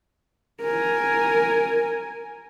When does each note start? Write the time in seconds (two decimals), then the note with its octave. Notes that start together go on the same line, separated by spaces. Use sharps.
0.62 A#4 G#5